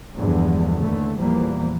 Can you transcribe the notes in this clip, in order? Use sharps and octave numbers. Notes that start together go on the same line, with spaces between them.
E2 G2 D3 F3 G#3
D#2 D3 E3 A3
E2 A#2 E3 F3 G3 A#3